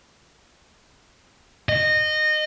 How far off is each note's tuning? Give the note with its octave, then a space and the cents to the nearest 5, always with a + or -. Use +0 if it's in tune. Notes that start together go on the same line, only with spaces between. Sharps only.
D#5 -20